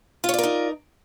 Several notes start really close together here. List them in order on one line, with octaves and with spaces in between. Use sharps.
F4 C#5 D5 A#4 D#4